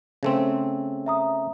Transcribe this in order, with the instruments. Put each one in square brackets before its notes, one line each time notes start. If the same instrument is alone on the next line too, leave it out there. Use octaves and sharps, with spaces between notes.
[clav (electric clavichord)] C#3 A3 C4
[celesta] E5 A#5 D#6